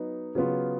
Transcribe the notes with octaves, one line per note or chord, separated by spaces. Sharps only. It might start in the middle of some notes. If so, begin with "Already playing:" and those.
Already playing: F#3 B3 D#4
C#3 F#3 B3 F4